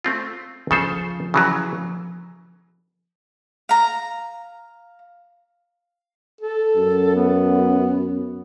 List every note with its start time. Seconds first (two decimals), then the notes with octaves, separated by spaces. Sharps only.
0.04 A3 C4 F4
0.71 C#3 F3 A4 C5
1.34 C#3 E3 F#3
3.69 F5 A#5
6.41 A4
6.76 F#2
7.16 B3